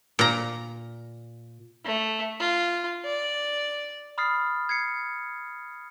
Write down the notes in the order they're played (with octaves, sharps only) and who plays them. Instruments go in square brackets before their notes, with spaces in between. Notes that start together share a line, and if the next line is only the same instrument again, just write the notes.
[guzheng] A#2 A#5
[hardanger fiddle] A3
F4
D5
[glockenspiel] B5 D#6 F6 A6 C7
G#6 C7 C#7